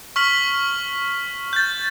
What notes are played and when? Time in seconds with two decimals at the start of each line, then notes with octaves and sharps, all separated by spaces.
0.16 C#6 F6 B6 F#7
1.53 G6 A6